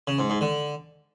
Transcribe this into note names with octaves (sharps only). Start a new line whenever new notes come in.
C#3
G#2
G#2
D3